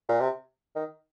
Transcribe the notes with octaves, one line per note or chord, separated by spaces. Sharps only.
A#2
C3
D#3